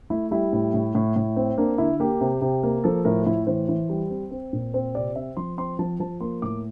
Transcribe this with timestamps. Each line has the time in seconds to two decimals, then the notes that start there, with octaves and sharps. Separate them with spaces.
0.10 A3 E4
0.31 G3 E4
0.53 A2
0.74 A2
0.95 A2
1.16 A2
1.36 C4
1.58 A#3 D4
1.78 D3 E4
2.00 A#3 G4
2.21 C3
2.41 C3
2.63 A#3
2.84 F3 A4
3.05 A2 A#4
3.22 F4
3.26 A2 E4
3.47 E3 C5
3.69 E3
3.89 G3
4.10 C4
4.31 C4
4.53 A#2
4.74 C4 C5
4.95 C3 D5
5.16 C4 E5
5.37 F3 C6
5.58 C4 C6
5.79 F3 A5
6.00 F3 A5
6.21 A#3 C6
6.42 A2 D6